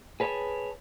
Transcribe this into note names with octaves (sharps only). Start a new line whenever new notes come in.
G#4 B4 C#5 D5 G5 A5